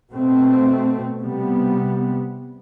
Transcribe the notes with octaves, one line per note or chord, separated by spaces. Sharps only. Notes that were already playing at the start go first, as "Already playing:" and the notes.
B2 A3 C4
C3 G3 B3